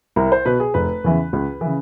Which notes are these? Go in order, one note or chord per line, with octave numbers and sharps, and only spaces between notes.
C2 A#4
C5
B2 B4
G#4
F1 B4
E2 C#3 E3
C#2
C#3 E3